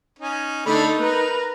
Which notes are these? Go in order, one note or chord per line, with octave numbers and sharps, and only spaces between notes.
C#4 D#4
D3 A3 D#4 A4 B5
A#4 B4 A#5